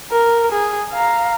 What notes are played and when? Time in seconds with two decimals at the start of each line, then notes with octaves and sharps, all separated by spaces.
0.11 A#4
0.52 G#4
0.91 F5 A#5